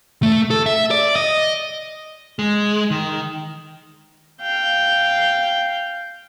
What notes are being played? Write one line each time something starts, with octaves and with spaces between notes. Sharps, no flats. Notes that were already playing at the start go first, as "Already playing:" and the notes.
A3
A4
E5
D5
D#5
G#3
D#3
F5 G5